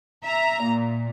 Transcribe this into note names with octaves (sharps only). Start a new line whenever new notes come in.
E5 A#5
A#2